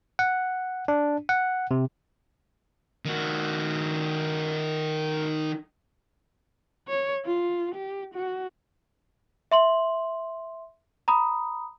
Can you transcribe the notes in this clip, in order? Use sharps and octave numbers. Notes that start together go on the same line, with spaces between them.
F#5
D4
F#5
C3
D#3 F#4
C#5
F4
G4
F#4
E5 C6 F#7
A#5 B5 D#6